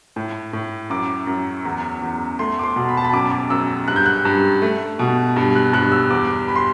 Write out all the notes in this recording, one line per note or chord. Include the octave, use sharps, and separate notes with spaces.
A2
A2
F#2 D6
F#2
E2
E2
A3 C6
D6
C6
B2
B5
A5
B5
F#2 D6
D6
F#2 E6
G2 F#6
G6
F#6
G2
A3
B2
G2
F#6
G2 F#6
E6
E2 D6
B5
C6